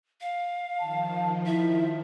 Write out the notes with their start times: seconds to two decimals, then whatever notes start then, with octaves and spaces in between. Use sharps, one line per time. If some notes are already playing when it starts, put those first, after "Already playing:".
0.21 F5
0.80 D#3 F3 A5
1.46 E4 E5